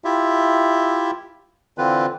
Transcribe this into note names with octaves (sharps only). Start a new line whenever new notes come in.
E4 F4 G4 E5
D3 E3 C4 F4 B4